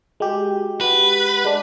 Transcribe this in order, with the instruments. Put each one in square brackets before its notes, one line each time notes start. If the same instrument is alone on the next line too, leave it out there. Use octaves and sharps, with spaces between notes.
[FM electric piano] G#3 G4 [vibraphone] F#4
[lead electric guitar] B4 [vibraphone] F#5
[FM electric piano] G#3 D4